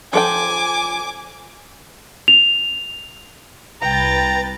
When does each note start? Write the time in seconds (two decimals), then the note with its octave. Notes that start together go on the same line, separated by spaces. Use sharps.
0.13 F3 A4 G5 G#5 D6
2.28 F7
3.81 C2 B4 G5 A#5 A6